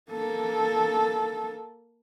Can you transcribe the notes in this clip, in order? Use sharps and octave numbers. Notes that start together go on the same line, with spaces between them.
A#3 A4